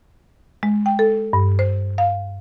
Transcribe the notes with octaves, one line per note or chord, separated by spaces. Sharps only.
G#3
G5
A4
G2
C5
F5